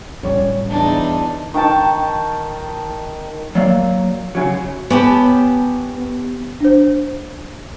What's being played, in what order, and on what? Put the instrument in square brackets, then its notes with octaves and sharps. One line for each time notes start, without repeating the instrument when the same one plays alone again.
[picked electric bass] D1 G3 [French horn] C#4 [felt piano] C#5
[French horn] E2 [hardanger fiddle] D4 D#4
[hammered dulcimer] D#3 G5 A5 C#6
[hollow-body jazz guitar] F#3 A#3 D5 F5
F#2 C#3 F#3
[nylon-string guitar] B3 [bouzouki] C#4 G4 A5
[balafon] D4 C5